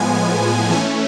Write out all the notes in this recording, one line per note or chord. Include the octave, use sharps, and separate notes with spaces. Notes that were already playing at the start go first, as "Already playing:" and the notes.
Already playing: A2 F3 G#3 B3 G#5
E3 A3 C#4